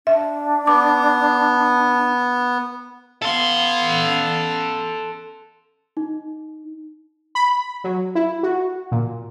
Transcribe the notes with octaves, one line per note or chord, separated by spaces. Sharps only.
D4 E5
B3 D6
B3 A4 F5 C6
D#4
B5
F#3
E4
F#4
A#2